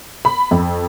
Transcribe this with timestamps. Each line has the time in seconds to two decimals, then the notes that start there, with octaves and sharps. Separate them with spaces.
0.25 B5
0.51 F2